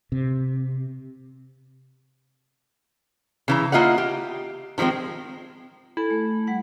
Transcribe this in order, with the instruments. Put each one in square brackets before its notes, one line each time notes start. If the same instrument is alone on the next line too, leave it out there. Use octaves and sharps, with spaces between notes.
[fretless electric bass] C3
[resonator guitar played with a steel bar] C#3 E3 A#5
A#3 F4 D#5 E5 F#5
G4
D#3 F3 G3 G#3 C4
[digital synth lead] E4 [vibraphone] A4 G#5
[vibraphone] A3
G3 F#5